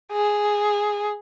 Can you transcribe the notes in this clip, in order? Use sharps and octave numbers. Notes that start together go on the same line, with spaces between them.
G#4